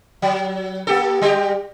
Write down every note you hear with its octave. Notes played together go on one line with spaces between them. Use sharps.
F#3
A#3 G4 A4
G3 G4